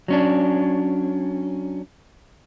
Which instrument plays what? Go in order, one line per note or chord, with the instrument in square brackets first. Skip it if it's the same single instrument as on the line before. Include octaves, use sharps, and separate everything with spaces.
[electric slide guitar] F#3 C#4 D4